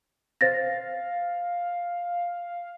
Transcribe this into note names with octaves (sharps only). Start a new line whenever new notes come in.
C5 F5 A6 A#6